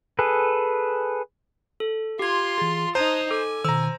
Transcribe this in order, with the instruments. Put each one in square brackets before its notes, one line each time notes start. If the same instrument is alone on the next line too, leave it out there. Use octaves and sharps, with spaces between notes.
[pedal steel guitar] G#4 A4 B4
[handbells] A4
[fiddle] F4 C6 [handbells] G4 G#6
[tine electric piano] E3 G#4 [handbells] A6
[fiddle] D#4 D#6 [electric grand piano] C5 [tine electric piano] A5 F#6 G#6 [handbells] A#5
[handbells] A4 [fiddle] G#5 [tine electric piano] D6
[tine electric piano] B2 D#3 [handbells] C5 [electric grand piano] A#5 E6